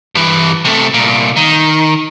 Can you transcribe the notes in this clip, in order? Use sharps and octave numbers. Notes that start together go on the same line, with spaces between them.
G2 E3
C3 A3
C2 A#2
D#3